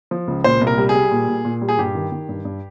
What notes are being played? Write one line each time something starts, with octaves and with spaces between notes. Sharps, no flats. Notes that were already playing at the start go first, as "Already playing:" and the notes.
F3
C#2
A#2 C5
C2
A#4
G3
G#4
G3
A#2
A#2
A#2
G3
G#4
G2 G4
D#3
D#3
G2
G2